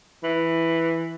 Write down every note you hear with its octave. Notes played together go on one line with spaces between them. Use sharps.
E3